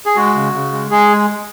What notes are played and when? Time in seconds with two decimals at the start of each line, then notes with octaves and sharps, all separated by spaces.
0.06 G#4
0.16 G#3 F#4
0.35 C#3
0.54 C#3
0.72 G#3
0.91 G#3 G#4